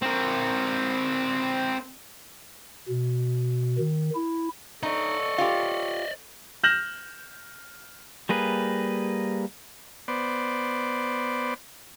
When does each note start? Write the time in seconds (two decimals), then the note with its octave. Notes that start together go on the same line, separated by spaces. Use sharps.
0.02 C4 A#4
2.89 B2
3.78 D#3
4.15 E4
4.83 D#4 A4 D5 D#5 C#6
5.38 F4 G4
6.64 F6 G6 A#6 E7 F#7
8.29 G3 A#3 G#4 B4
10.08 B3 C5 D5